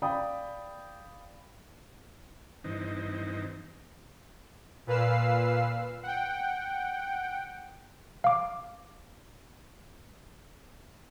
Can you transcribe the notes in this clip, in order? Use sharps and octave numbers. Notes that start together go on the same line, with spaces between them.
D5 F5 G5 B5 D#6
G2 E3 C4 D#4
A#2 B4 F5 E6 C7
F#5 G5
F5 D6